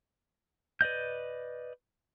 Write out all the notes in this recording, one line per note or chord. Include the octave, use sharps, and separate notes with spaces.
B4 D5 D#5 G6